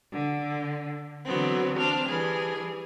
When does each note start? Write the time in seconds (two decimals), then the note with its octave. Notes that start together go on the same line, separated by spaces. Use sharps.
0.11 D3
1.26 D3 E3 F#3 B3 C4
1.77 C4 D4 F6
2.07 E3 G3 G#4